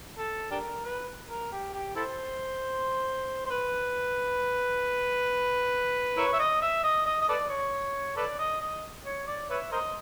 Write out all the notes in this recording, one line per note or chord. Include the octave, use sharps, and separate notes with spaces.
A4
D4 G4 A#4
B4
A#4
G4
G4
E4 A4 C5
C5
B4
E4 A#4 C#5
E5
D#5
E5
D#5
D#5
D#5
A4 B4 D5
C#5
A4 B4 D5
D#5
D#5
C#5
D5
B4 C#5 E5
A#4 C5 D#5